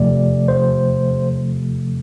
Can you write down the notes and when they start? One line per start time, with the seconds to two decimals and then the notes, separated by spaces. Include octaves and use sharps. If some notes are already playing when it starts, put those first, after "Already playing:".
Already playing: E2 C3 F3 A3 D5
0.48 C5